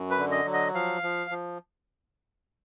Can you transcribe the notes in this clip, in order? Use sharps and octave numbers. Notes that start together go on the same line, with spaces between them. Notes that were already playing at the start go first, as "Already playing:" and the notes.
Already playing: F#2
B4
D3
D#5
F#3
D#5
F3 F5
F3
F3